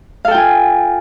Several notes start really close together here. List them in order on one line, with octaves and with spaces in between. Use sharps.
F5 A4 G5 F4 G#5